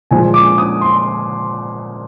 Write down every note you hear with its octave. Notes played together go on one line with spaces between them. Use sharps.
A#2 F3 G#3 G#5
D6
D#6
C6